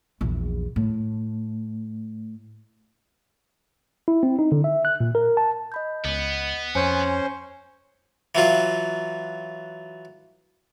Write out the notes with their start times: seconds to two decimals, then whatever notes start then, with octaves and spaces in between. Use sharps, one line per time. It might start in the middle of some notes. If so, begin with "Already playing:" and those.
0.21 A#1 E2
0.76 A2
4.08 E4
4.23 C4
4.39 D#4
4.52 D3
4.64 E5
4.85 F#6
5.00 A#2
5.15 A#4
5.37 A5
5.72 D#5 B5 G6
6.05 C#2 B3
6.75 F2 C#4 C5 G#5 C#7
8.35 E3 F#3 F4